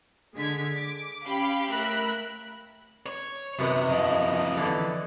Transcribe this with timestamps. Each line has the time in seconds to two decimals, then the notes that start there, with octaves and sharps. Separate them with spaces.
0.35 D3 G#3 G#6 B6
0.77 D6
1.27 C#4 G4 F5 B5
1.71 A3 A#4 E5 B5 F#6
3.06 C#5
3.59 F#2 C3 B3 D#4
3.90 E2 F3 D#5
4.57 D3 E3 A4